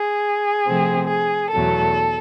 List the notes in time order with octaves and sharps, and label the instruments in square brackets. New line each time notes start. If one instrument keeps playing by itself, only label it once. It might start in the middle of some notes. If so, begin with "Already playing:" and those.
Already playing: [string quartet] G#4
C3 F3 A3 C4
G#4
E2 B2 F#3 A3 A4